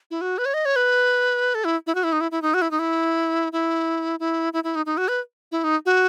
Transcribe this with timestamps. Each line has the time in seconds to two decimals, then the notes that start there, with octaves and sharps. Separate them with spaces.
0.11 E4
0.21 F#4
0.38 B4
0.45 C#5
0.54 D#5
0.65 C#5
0.76 B4
1.55 A4
1.65 E4
1.87 E4
1.95 F#4
2.04 E4
2.12 D#4
2.21 E4
2.31 E4
2.42 D#4
2.54 F#4
2.62 E4
2.71 D#4
2.79 E4
3.53 E4
4.20 E4
4.53 E4
4.64 E4
4.75 D#4
4.86 D#4
4.97 F#4
5.08 B4
5.52 E4
5.64 D#4
5.86 F#4